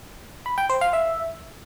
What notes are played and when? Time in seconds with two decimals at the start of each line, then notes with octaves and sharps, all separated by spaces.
0.46 B5
0.58 G5
0.69 C5
0.81 F5
0.93 E5